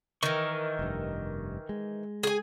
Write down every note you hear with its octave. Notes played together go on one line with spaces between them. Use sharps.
D#3 E3 A#4 D#5 C#6
F1 G2
G#3
G#4 G#5